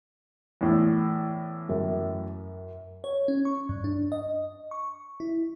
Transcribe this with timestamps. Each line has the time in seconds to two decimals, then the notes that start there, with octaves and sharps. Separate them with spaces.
0.61 E2 A2
1.69 F#2
3.04 C#5
3.28 C#4
3.45 C#6
3.69 G2
3.84 D4
4.12 D#5
4.71 C#6
5.20 E4